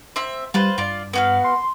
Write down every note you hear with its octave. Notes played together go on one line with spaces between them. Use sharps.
C4 E5
G3 F4 B4 C5
G2 F4 D5
B3 F#4 F5
C6